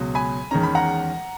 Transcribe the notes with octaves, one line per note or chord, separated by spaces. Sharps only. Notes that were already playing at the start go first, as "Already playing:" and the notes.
Already playing: C#2 B2 F#3
G#5 B5
E2 D#3 G#3 C#4 A#5
B5
F#5 A#5